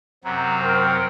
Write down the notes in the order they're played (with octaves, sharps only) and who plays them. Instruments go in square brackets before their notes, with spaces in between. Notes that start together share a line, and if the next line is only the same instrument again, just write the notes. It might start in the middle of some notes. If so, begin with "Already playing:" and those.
[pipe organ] F#2 C3 F#3 [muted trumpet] A#5
[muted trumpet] C4 [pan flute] A#4